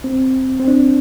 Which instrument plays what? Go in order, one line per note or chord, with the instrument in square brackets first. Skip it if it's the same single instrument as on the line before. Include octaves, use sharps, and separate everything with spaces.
[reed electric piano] C4
C4
D4